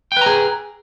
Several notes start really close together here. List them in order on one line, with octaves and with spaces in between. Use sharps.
G5 B4 A#5 G#4